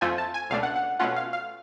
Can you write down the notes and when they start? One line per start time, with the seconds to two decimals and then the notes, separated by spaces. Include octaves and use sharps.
0.01 F2 F3 A3 F4 G#5
0.18 A5
0.34 G#5
0.50 C#2 B2 A3 D4 F5
0.63 F#5
0.76 F#5
0.99 B2 A3 C#4 F4 F#5
1.16 F5
1.33 F5